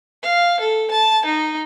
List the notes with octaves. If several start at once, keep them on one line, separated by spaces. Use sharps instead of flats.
F5
A4
A5
D#4